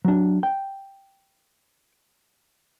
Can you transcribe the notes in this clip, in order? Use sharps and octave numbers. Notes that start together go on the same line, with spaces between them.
F#3 D4
G5